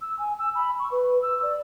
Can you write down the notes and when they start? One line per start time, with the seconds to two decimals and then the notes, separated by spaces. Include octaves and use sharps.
0.01 E6
0.19 G#5
0.39 E6
0.55 B5
0.79 C#6
0.91 B4
1.22 E6
1.43 D5